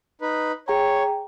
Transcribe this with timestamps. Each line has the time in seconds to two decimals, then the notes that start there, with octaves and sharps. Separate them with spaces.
0.21 D#4 B4
0.68 G#4 C#5 G5 A#5